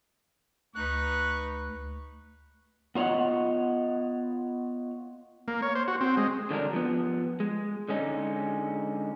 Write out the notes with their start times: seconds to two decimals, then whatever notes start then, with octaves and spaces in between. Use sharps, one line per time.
0.76 D2 D#4 B4 C#6 F#6
2.95 B3 F4 C#5 D#5 F#5
5.48 A#3
5.62 C#5
5.75 C5
5.88 F#4
6.01 C4
6.17 G#3
6.51 D3 F#3 G3 D4 A#4
6.73 F3 B3
7.40 G#3
7.89 D3 G#3 C#4 D#4